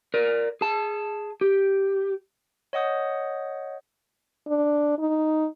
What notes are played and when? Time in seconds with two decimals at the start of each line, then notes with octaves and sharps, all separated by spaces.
0.14 A#4 D5
0.61 G#4 A5
1.41 G4
2.73 C#5 D#5 F#5 D#6 G6
4.47 D4
4.99 D#4